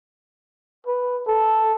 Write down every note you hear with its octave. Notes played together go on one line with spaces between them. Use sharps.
B4
A4